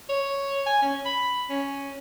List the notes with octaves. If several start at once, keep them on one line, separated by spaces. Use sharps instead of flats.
C#5
G#5
C#4
B5
C#4